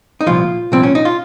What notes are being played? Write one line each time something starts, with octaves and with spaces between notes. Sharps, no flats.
D#4
C2 A#2 F3 F4
C2 A#2 F3 C4
C#4
D#4
F4